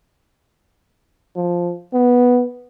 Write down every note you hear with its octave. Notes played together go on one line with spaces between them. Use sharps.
F3
B3